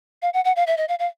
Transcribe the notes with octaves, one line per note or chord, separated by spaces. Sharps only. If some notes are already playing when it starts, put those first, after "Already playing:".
F5
F#5
F#5
F5
E5
D#5
F5
F5